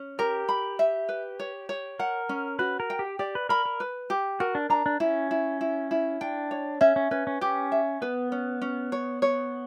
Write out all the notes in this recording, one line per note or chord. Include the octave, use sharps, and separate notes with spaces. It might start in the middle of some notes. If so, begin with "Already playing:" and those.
Already playing: C#4
G4 A#4
B5
E5
B4
C#5
C#5
A#4 F#5
C#4
F#4 B4
A#4
G5
G4
G4 D5
B4
A#4 B5
A#4
B4
G4
F#4 A#4
D4
D4 A#5
D4
C#4 E4
E4
E4
E4
D4 G5
C#5
C#4 E5
C#4
C#4 B4
C#4
C#4 G4
E5
B3 B4
C#4
C#4
C#5
C#5